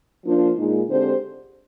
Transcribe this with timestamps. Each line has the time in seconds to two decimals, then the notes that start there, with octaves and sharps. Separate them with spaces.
0.25 F3 A#3 D4 F4 C5
0.57 A#2 G#3 D#4
0.89 D3 G#3 C4 G4 C5